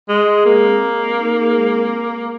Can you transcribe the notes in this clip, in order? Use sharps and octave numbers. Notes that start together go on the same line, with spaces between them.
G#3 G#4
G#4
G#3 A#3
C4
C4
C4
D#4
G#4
G#3
C4